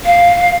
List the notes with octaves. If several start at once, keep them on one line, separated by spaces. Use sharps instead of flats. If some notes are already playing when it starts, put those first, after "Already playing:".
F5